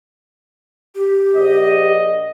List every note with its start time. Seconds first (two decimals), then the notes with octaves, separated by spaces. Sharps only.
0.95 G4
1.35 A#1 D#5